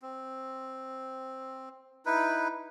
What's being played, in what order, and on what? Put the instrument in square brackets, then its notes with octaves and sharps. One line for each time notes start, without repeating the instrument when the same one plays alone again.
[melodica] C4
D#4 E4 B4